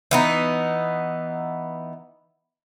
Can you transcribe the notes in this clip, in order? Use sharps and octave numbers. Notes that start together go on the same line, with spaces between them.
E3 B3 D#4